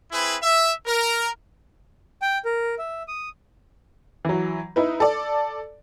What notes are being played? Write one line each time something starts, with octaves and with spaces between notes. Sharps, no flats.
C4 E4 G#4 B4
E5
A#4
G5
A#4
E5
D#6
E3 F#3
D#4 E4 B4
A4 D5